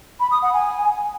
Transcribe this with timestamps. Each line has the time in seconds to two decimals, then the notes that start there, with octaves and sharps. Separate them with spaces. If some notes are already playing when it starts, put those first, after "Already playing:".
0.20 B5
0.31 D#6
0.42 F#5
0.54 G#5